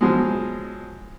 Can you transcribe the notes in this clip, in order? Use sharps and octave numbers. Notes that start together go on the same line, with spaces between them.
B2 F3 F#3 G#3